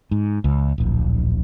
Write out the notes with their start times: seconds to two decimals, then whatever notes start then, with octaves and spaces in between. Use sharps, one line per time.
0.11 G#2
0.44 C#2
0.78 D1 A#1